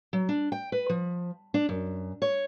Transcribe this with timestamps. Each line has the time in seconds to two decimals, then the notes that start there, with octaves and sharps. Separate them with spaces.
0.13 F#3
0.29 D4
0.52 G5
0.72 B4
0.89 F3
1.54 D4
1.69 F#2
2.22 C#5